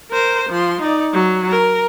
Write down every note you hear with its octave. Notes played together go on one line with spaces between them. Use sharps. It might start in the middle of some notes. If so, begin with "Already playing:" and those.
A#4 C5
F3 C6
D#4 D5
F#3
A#4